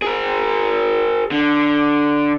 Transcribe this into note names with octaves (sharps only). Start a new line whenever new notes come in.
G#4 A#4
D3